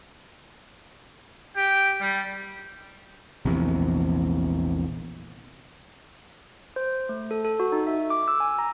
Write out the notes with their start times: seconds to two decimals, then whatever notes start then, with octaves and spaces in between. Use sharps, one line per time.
1.55 G4 G5
2.00 G3
3.45 A#1 E2 C3
6.76 C5
7.09 A3
7.31 A4
7.45 A4
7.60 F#4
7.72 D#4
7.87 E5
8.10 D6
8.28 E6
8.40 G#5
8.59 A#5